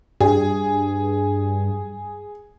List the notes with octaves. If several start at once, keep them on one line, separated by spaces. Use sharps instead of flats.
G2 G#4